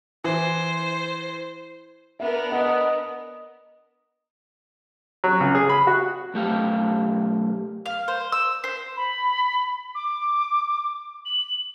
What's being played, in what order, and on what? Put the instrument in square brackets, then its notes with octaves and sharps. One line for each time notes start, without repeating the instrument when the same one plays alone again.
[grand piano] E3 [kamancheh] C5
[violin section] B3 D4 A#4 [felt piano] E5
[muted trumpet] D#5 [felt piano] F#5
[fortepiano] F#3
C#2
G#4
B5
F#4
[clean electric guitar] B1 A3 G4 F5
[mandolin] F5
C5
E6
C5
[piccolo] B5
D6
F#7